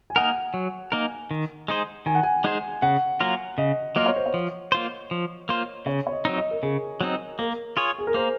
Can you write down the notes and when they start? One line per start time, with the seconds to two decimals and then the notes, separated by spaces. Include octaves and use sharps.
0.10 G#5
0.16 A#3 D#4 A#4 F#5
0.54 F#3
0.92 A#3 D#4 A#4
1.31 D#3
1.68 G#3 D#4 G#4 C5
2.06 D#3 G#5
2.15 F#5
2.23 G#5
2.44 G#3 D#4 G#4 C5
2.82 C#3 F#5
3.20 F#3 A#3 F4 A#4
3.58 C#3 D#5
3.96 F#3 A#3 F4 A#4 D#5
4.06 C#5
4.16 C5
4.26 C#5
4.34 F3
4.72 A#3 F4 C5
5.11 F3
5.49 A#3 F4 C5
5.86 C#3 C#5
6.07 C#5
6.12 D#5
6.25 F#3 C4 D#4
6.37 D#5
6.51 A#4
6.63 C#3 G#4
7.01 F#3 C4 D#4
7.39 A#3 A#4
7.77 F4 G#4 C#5
7.99 G#4
8.07 A#4
8.14 A#3 C5